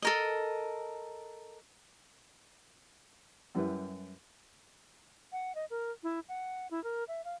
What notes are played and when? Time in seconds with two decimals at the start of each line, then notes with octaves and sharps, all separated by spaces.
0.02 A4 A#4 D#5
3.55 F#2 G3 E4 B4
5.32 F#5
5.55 D#5
5.70 A#4
6.03 E4
6.29 F#5
6.71 E4
6.84 A#4
7.08 E5
7.25 F5